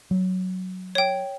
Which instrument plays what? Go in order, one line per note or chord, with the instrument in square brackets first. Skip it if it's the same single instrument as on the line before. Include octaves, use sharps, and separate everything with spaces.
[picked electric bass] F#3
[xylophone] C#5 G5